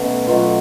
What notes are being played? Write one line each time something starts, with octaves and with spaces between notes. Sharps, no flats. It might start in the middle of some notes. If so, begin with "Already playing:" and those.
Already playing: B2 F#3 A3 C#4
B2 F#3 A3 F4